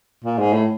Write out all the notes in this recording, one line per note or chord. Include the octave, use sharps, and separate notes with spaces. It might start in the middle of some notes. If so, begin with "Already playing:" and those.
A#2
G#2
A2